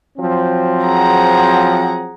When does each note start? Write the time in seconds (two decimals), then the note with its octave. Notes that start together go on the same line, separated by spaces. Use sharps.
0.18 F3 F#3 C4
0.85 G#4 F#5 A#5